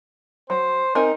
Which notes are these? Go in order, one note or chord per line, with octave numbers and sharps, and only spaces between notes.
F#3 C5
C4 D#4 A#4 G#5